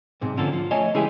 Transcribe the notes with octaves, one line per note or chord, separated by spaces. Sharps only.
B1 G#2 C3
D3 F3 A#3 C#4 A4
F3
A3 C#5 D#5 G#5 A5
C#3 E3 G#3 G4 G#4